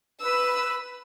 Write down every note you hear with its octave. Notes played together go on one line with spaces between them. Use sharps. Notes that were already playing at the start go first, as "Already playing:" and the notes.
B4 E6